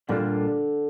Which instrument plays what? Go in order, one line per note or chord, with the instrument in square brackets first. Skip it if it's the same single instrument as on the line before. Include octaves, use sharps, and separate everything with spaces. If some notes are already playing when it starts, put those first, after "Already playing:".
[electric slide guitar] A#2 G3 A#3 D4 F4 [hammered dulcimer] D3